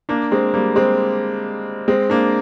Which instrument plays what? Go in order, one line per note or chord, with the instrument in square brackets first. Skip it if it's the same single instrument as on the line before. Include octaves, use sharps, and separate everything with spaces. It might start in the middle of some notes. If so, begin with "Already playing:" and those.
[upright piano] A#3 D4
G#3 C4
G3 A#3
G#3 C4
G#3 C4
A#3 D4